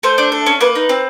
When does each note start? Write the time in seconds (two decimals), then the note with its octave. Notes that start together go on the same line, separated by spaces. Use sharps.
0.03 A3 C5
0.18 D4
0.32 A4
0.46 C#4
0.61 A#3 B4
0.76 D#4
0.89 C4